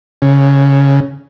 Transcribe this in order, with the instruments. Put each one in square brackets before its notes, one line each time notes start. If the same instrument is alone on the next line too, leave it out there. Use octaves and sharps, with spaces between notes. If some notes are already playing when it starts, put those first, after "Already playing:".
[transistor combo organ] C#3